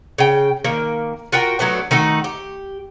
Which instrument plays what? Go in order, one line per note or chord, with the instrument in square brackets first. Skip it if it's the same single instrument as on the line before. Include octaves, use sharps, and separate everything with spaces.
[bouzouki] C#3 G5
D#3 A#3
F4 F#4 A#4 G5
F#3 A3 B3 D4
D#3 A3 D#4 F#4
G4